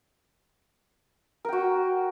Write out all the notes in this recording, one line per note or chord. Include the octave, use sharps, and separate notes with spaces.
F#4 A#4 G5